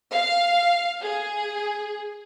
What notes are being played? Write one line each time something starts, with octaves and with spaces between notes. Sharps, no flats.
F5
G#4